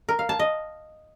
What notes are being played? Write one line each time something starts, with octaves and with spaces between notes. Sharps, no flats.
A#4
F5
A5
D#5